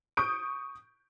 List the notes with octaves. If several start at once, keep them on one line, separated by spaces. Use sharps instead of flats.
C#6 D#6 G6 D7